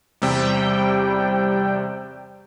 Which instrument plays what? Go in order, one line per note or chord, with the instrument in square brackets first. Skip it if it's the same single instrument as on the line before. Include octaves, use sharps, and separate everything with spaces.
[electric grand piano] E2 C3 C4 [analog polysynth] G3 G5